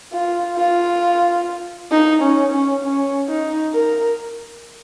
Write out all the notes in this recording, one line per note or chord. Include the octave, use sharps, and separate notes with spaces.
F4
F4
D#4
C#4
C#4
C#4
D#4
A#4